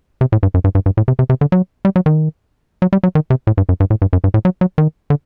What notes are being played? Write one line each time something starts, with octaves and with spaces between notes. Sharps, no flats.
C3
A2
G2
F#2
G2
G2
G2
A2
C3
C3
C3
D3
F#3
G3
F#3
D#3
F#3
G3
F#3
D#3
C3
A2
G2
F#2
G2
A2
G2
F#2
G2
A2
F#3
F#3
D#3
D3